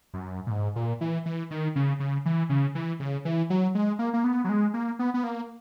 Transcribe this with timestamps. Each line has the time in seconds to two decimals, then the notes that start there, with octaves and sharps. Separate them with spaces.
0.14 F#2
0.47 A#2
0.51 G#2
0.76 A#2
1.01 E3
1.26 E3
1.51 D#3
1.76 C#3
2.00 C#3
2.26 E3
2.49 C#3
2.75 E3
3.00 C#3
3.25 E3
3.50 F#3
3.75 G#3
3.99 A#3
4.13 A#3
4.24 B3
4.44 F#3
4.49 G#3
4.74 A#3
4.99 B3
5.14 B3
5.24 A#3